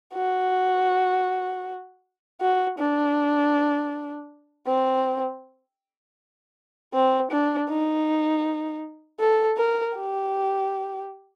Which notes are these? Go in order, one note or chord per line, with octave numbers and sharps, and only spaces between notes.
F#4
F#4
D4
C4
C4
D4
D#4
A4
A#4
G4